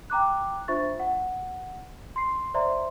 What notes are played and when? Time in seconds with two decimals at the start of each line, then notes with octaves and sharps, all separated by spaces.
0.10 G5 A#5 D6 F#6
0.68 D4 F4 C5 E5 C#6 A6
0.99 F#5
2.16 C6 C7
2.54 C5 D5 E5 A#5 C6